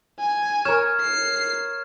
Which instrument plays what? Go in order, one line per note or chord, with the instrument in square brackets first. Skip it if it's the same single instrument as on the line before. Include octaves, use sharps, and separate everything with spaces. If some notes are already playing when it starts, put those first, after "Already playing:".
[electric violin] G#5
[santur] A#4 C#5 [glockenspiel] F6 G#6 E7
[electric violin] C7